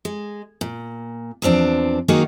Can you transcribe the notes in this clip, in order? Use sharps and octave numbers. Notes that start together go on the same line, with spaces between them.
G#3
A#2
E2 F3 C4 D4
D#3 F#3 A#3 D#4 F#4 G#4